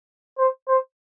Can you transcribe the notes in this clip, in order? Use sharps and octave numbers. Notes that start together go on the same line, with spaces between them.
C5
C5